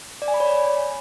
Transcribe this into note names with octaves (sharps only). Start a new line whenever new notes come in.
D5
G#5
B5
C#5
D5